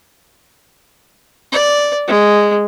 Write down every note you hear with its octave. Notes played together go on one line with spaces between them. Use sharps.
D5
G#3